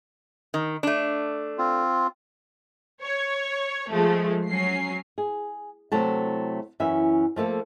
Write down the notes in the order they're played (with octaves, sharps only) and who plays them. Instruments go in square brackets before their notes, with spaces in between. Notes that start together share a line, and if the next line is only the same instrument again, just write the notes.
[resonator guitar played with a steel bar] D#3
A3 D4
[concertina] C4 F4
[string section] C#5
F3 G#3 A3
F#3 C#4 C7
[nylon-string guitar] G#4
C3 F#3 A3 E4 A5
F#2 E3 C#4 E5
F3 A3 A#3 A4